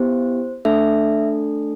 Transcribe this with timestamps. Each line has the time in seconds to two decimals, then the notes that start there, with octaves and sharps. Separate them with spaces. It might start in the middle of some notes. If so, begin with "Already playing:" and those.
Already playing: B3 E4 G4 C5
0.65 A3 D4 A4 E5